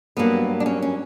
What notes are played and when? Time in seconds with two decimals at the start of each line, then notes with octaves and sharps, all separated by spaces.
0.17 G2 F#3 A#3 B3
0.60 D4
0.66 C#4
0.83 C#4